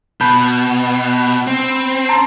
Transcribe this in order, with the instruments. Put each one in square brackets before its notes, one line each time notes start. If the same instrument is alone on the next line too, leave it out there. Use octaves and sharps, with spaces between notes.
[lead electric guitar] B2 [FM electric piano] A5 B5 G6
[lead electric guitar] C4
[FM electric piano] A5 A#5 C6